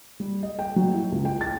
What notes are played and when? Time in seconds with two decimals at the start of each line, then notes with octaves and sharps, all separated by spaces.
0.20 G3
0.43 D#5
0.59 G5
0.76 F#3
0.94 E4
1.12 C#2
1.25 G5
1.41 A6